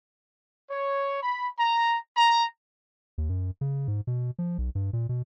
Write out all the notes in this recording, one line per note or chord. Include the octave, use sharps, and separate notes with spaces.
C#5
B5
A#5
A#5
D#2
F#2
C#3
G#2
B2
F3
B1
G2
A#2
B2